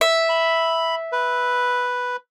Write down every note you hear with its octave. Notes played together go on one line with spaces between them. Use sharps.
E5
B5
B4